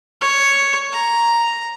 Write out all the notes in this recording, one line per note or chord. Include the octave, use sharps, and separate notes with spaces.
C#5
A#5